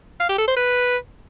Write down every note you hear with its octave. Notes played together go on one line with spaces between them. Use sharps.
F5
G4
A4
C5
B4